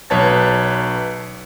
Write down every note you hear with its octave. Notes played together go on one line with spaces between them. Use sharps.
B1 B4 C#5 A5 A6